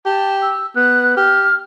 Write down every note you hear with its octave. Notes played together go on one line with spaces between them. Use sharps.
G4 A5
E6
B3 F#6
G4 F6